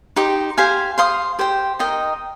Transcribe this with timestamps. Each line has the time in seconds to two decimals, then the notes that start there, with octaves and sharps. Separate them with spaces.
0.16 D#4 G4 C5
0.57 G4 C5 F5 G#5
0.98 C5 F5 C6 D#6
1.39 G4 C5 G5
1.79 D#4 A#4 D#5 G5